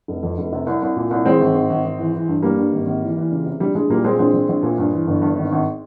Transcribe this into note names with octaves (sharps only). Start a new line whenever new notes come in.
F1
F2
F1
C3
C2
C2
A#2
C2
E3 G#3 C4
G#1
G#1
G#1
G#1
E3
E3
G2
G2 G3 A#3
G2
G#1
G#1
E3
E3
C#2
C3
A#1 G3
A#1 G#3
A#2 G3 A#3
A#2 G#3 C4
A#1 G#3 C4
A#1
A#1
A#2
G2
E3
G1
G2
G#1
G#1